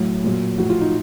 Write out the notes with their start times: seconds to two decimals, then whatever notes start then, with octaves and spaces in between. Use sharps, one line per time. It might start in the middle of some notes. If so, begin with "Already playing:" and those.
Already playing: A2 F#3
0.24 A#2 F#3
0.58 A2 F3 F#4
0.70 F4
0.81 D#4